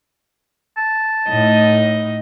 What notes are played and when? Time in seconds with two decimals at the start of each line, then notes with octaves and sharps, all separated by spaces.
0.77 A5
1.29 A2 D#4 D#5